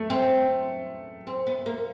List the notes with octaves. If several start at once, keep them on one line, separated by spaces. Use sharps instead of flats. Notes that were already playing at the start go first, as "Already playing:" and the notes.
Already playing: A3
C4
C4
B3
A#3